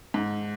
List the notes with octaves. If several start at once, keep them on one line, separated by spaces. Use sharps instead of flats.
G#2